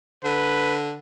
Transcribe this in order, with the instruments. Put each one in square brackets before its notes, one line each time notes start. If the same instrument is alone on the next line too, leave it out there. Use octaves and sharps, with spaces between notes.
[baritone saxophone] D3 [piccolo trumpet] B4